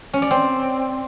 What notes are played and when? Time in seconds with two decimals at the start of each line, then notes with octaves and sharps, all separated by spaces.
0.13 C#4
0.22 D5
0.31 C4